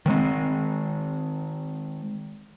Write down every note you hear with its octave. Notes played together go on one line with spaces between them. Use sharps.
D#3 G#3 C4